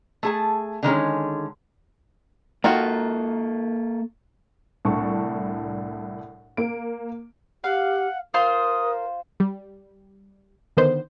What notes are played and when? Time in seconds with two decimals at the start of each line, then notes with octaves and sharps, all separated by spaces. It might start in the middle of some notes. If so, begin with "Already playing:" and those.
0.23 A3 G#4 A5
0.83 D3 D#3 G#3 C#4
2.64 D#3 A#3 F4 F#4 A4
4.85 C2 A2 D4 A5 C#6
6.57 A#3 D7
7.64 G4 F5 F#5
8.34 F4 A#4 C5 C6 D#6
9.40 G3
10.77 D3 D#3 B3 C5